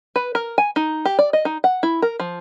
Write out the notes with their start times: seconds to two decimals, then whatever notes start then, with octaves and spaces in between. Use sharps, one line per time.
0.16 B4
0.35 A#4
0.58 G#5
0.76 D#4
1.05 G4
1.19 D5
1.33 D#5
1.45 D#4
1.64 F#5
1.83 E4
2.02 A#4
2.20 F3